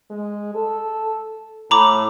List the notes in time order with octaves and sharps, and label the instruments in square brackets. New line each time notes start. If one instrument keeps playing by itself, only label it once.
[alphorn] G#3
A4
[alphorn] A2 [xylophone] A#5 B5 D6